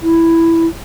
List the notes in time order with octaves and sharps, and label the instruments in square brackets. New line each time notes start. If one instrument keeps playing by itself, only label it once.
[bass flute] E4